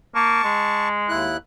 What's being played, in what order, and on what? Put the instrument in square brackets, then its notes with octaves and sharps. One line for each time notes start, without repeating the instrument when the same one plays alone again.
[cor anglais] A#3 [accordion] A5 C#6
[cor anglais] G#3
[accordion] D#2 E4 F#6